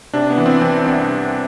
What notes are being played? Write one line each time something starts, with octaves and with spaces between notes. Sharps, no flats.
C3 D4
B3
E3
C4
E3 C4
C2 D4